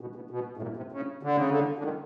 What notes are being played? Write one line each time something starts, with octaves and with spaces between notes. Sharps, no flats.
B2
B2
B2
A2
A#2
C3
C#3
D3
C#3
D3
D3
D#3